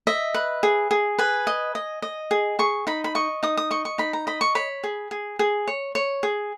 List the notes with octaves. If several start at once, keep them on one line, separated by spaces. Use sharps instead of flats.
D#5 E5
B4
G#4
G#4
B4 G#5
D#5
D#5
D#5
G#4
G#4 C#6
D#4 B5
B5
D#5 C#6
D#4 D#6
D#6
D#5 C#6
C#6
D#4 B5
A#5
D#5 B5
C#6
C#5 B5
G#4
G#4
G#4
C#5
C#5
G#4